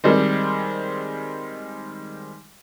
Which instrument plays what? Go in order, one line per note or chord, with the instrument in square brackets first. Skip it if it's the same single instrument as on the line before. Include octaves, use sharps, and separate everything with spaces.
[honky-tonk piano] D#3 G3 G#3 C4